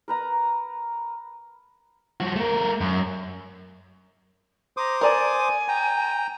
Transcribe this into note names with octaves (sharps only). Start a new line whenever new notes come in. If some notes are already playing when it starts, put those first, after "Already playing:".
A#4 B4 A#5
F3 F#4
A3 A#4
F#2
C5 A#5 D6 D#6
A#4 D5 G#5 A5
G5 A#5